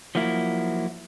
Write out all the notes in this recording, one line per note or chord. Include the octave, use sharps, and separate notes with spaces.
F3 F#3 A#3 E4